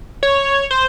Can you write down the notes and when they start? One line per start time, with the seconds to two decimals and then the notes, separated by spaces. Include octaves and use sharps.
0.23 C#5
0.71 C5